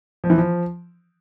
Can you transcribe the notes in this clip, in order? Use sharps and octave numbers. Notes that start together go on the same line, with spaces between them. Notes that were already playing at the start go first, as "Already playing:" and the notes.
F3
E3
F3